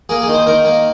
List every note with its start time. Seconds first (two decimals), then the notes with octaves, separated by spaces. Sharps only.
0.09 A#3 G#4
0.22 G#4
0.28 D#3
0.34 C5
0.46 D#3 A#4
0.65 A#3